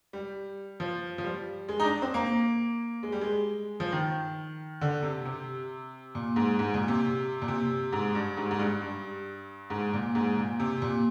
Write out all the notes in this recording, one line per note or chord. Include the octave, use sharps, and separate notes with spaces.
G3
F3
F3
G3
G#3
D#4
D4
C4
A#3
G#3
G3
G#3
F3
D#3
D3
C3
C3
A#2
G#2
G#2
A#2
C3
A#2
C3
G#2
G2
G#2
G#2
G2
G2
G#2
A#2
G#2
A#2
C3
A#2